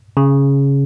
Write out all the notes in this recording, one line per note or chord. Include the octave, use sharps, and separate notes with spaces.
C#3